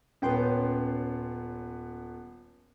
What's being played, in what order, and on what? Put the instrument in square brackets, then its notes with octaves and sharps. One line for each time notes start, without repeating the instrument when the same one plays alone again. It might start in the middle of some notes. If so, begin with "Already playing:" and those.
[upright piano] D#1 B3 [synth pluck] C#4 G5 C6